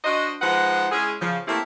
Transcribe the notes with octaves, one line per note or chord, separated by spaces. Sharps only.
D4 F#4 C5 D#5
F3 G#3 D#4 B4 F#5
G#3 C#4 E4 G#4
C#3 F3
A3 A#3 C4 C#4 E4 G4